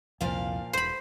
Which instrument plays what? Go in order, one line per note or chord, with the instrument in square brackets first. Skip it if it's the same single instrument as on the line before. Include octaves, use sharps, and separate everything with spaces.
[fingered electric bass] C2 F2 [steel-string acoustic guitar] A#2 F3 F5
[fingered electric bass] E1 [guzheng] C5 B5